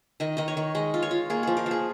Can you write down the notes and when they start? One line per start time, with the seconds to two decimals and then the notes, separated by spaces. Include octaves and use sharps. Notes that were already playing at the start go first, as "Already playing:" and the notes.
0.20 D#3 D#5
0.37 D#3 D#5
0.48 C#5
0.57 D#3
0.75 G#3 D#5
0.94 F4
1.02 C#5
1.11 F4
1.30 A#3 G#4
1.43 F3 G#4
1.57 A#4
1.66 F3 G#4